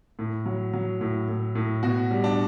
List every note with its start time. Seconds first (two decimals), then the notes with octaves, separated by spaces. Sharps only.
0.19 A2
0.46 F#3
0.73 F#3
1.01 A2
1.28 A2
1.55 A2
1.83 B2 F#4
2.11 G3
2.24 D4